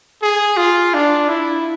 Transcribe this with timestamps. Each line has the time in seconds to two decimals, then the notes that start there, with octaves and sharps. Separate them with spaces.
0.22 G#4
0.57 F4
0.94 D4
1.29 E4